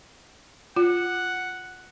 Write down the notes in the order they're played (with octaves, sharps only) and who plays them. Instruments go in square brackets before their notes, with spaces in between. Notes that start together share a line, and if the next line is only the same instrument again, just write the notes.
[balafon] F4 [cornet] F#5